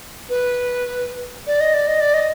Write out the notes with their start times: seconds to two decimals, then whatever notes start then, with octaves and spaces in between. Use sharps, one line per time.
0.30 B4
1.47 D5
1.61 D#5
1.74 D5
1.88 D#5
2.00 D5
2.14 D#5